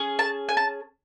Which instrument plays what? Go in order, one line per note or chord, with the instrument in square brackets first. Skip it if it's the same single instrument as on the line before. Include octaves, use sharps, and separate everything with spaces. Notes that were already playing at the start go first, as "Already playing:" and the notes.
Already playing: [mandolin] C#4 G#4
A5
G#5
A5